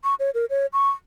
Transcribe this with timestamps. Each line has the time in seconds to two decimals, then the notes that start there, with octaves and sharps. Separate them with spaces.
0.04 C#6
0.20 C#5
0.34 A#4
0.50 C#5
0.73 C#6